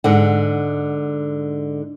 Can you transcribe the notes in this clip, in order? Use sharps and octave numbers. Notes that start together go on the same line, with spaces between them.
G#2 D3 F#5